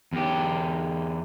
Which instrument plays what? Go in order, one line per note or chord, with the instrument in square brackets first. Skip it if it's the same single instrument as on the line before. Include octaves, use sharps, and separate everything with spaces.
[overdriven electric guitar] E2 G4